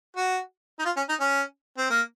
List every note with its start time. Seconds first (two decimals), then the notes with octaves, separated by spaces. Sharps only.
0.17 F#4
0.79 D#4
0.85 F4
0.97 C#4
1.09 D#4
1.20 C#4
1.78 C4
1.90 A#3